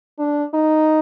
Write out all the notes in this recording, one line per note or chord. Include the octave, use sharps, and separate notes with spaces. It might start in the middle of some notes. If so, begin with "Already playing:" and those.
D4
D#4